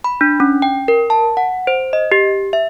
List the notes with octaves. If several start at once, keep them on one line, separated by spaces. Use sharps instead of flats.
B5
D4
C#4
G5
A#4
A5
F#5
C5
D#5
G4
E5